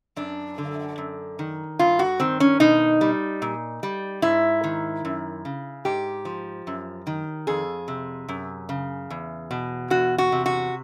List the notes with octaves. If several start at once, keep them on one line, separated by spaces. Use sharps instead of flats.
F#2 D4
D3
F#2
D#3
G2 F4
F#4
D#3 C4
C#4
B2 D#4
G3
A#2
G3
G#2 E4
D#3
F#2
C#3
G#2 G4
F3
F#2
D#3
F2 G#4
C3
F#2
C#3
E2
B2
E2 F#4
F#4
C3
F#4